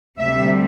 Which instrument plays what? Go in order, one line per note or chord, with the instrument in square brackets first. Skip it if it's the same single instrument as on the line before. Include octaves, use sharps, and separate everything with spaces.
[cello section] D2 C3 G3 E5